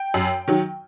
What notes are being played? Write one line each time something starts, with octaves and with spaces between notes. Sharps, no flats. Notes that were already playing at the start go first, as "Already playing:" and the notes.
Already playing: G5
F#2
D#3 F#3